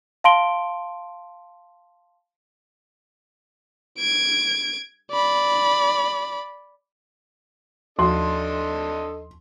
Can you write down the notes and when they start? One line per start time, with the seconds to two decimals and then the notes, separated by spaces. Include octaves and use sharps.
0.24 F5 A5 C6 D7 G7
3.99 G#6 D7
5.11 D5 B5
7.99 D#2 F3 D4 F#4 A4 D#5 C6